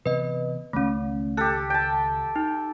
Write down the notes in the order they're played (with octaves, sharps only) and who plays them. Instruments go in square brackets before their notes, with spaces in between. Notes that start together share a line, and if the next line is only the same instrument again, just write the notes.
[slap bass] C3 E3 B3 [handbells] B4 D#5
[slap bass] C#2 D#3 [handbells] A3 C#4
[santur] G4 A4 [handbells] F#6
[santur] G5 A5
[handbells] D#4